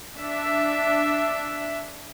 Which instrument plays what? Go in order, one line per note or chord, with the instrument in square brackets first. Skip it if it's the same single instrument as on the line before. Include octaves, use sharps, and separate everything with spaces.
[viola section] D4 E5